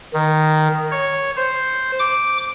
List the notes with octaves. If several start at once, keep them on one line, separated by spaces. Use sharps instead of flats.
D#3
C#5
C5
D6